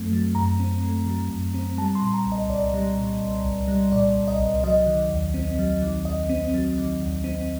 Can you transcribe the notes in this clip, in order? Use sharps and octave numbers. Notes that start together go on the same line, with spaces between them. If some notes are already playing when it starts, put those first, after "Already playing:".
Already playing: F#2 F#3 A3 C4
F#3
F#2 A#5
C4
A3
F#3
F#2
C4
G3 A5
C6
A#2
A#5
C2
D#5
C2 D5
G3
A#2
C2
C2
G3
A#2 D5
C2
D#5
C2
F#3 D#5
D#3
D#2
C4
F#3
D#3
D#2 D#5
C4
F#3
D#3
D#2
C4